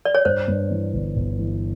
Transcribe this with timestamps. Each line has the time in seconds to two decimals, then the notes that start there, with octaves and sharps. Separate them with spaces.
0.05 D5
0.15 C#5
0.25 G2 C5
0.48 G2
0.70 E3
0.94 G1
1.17 G1
1.39 E3